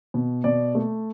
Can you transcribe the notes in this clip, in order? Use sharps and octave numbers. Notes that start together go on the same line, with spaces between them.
B2
B2 D5
A3